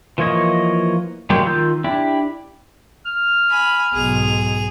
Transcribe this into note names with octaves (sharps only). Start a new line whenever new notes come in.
E3 F3 A#3 C#5 D#5
F#3 G#3 A#3 G4
D#3 F4 E6 G6
D4 E4 G4
F6
G#5 B5
B1 G#2 G#4 F7